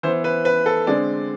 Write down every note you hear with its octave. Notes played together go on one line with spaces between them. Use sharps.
E3 B3 C5
B4
B4
A4
D3 G#3 C4 D5